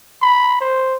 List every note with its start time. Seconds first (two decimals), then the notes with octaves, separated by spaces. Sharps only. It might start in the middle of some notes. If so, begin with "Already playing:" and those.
0.22 B5
0.61 C5